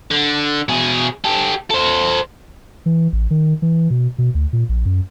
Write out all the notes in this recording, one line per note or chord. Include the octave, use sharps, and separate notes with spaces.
D3
B2 G#4
G4 A4
A4 C5
E3
A1
D#3
E3
B2
B2
D2
A#2
A#1
F#2